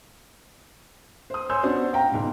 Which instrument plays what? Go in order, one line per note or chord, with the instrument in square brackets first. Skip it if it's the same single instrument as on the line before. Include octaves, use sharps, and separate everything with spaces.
[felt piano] C5 D#6
C#5 G#5 C6 E6 G6
B3 C#4 D4 F#4 C5
F5 G5 A#5
C#2 G#2 B2